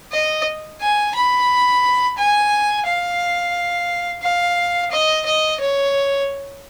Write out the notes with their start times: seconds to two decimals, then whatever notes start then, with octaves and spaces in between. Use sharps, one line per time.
0.12 D#5
0.81 G#5
1.15 B5
2.18 G#5
2.85 F5
4.22 F5
4.91 D#5
5.25 D#5
5.60 C#5